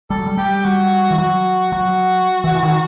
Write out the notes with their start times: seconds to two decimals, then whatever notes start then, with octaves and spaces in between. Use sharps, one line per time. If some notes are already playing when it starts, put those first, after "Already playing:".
0.10 G3 A4
0.18 F#3
0.26 G3
0.37 G3 G4
0.64 G3 F#4
1.11 E3
1.18 F#3 F#4
1.72 F#3 F#4
2.44 E3
2.55 E3
2.63 D#3